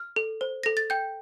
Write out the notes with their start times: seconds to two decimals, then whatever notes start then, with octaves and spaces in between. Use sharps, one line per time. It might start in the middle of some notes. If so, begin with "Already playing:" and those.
Already playing: F6
0.16 A4
0.41 C5
0.63 A4 A#6
0.77 A6
0.90 G5 G6